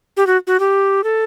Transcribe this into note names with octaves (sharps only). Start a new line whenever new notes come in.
G4
F#4
F#4
G4
A4